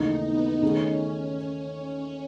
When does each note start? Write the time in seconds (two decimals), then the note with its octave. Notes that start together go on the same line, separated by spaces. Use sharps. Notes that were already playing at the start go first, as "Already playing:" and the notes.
Already playing: D#2 C#3 E3 A3 D#4
0.25 B3
0.62 D#3 A3 C#4 D#4 G#4